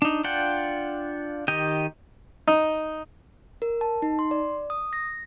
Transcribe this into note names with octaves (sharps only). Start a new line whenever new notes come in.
D4 D#4
D4 F4 D5 F#5 G5
D#3 G4 D#5 G5
D#4
A#4
A5
D#4
C6
D5
D#6
A#6